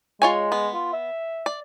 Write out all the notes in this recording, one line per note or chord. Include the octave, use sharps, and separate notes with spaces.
G#3 F4 C#5 G#5
B3
F4
E5
D5